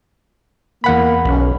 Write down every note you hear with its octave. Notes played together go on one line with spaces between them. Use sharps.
E2 A#3 F#5 B5
B1 C#4